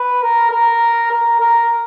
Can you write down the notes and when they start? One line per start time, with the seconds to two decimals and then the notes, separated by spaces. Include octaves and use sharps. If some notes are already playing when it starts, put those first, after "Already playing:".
Already playing: B4
0.22 A#4
0.51 A#4
1.11 A#4
1.41 A#4